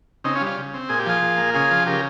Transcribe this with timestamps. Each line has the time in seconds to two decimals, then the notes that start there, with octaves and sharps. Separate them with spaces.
0.24 C#3 C4 D#4
0.35 C#4 F4
0.41 G3
0.46 C#4 F4
0.57 C#3
0.74 C4
0.89 A#2 G#4
0.99 G4
1.06 F3 F4 G#4
1.22 A#2
1.38 A#3
1.54 C#3 F4 G#4
1.71 F3
1.86 C#3 G4 A#4